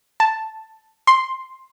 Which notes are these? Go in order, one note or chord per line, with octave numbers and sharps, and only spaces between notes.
A5
C6